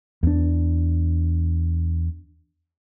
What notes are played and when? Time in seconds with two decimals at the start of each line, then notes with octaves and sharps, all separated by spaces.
0.23 E2 D4